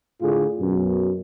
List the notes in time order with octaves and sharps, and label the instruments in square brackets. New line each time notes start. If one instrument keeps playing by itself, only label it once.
[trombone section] A2 D3 F4 G#4
F#2 B2